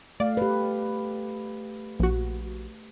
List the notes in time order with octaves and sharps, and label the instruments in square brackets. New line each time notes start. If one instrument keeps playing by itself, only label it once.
[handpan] A3 F5 [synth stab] D5
[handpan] G4 B4
[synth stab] A#1 F#4